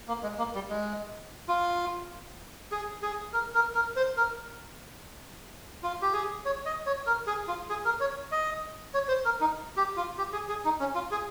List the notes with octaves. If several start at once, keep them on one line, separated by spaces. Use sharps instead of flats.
A#3
G#3
A#3
G3
G#3
F4
G#4
G#4
A#4
A#4
A#4
C5
A#4
F4
G4
G#4
C#5
D#5
C#5
A#4
G#4
F4
G#4
A#4
C#5
D#5
C#5
C5
A#4
D#4
G4
F4
G4
G#4
G#4
D#4
C#4
F4
G#4